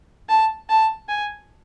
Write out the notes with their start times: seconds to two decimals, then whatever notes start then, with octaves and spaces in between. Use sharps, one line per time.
0.29 A5
0.69 A5
1.09 G#5